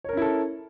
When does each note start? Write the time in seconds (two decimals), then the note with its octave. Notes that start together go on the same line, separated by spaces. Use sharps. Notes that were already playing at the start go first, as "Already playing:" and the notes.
0.04 C#5
0.09 A#4
0.13 C#4
0.17 E4
0.22 A4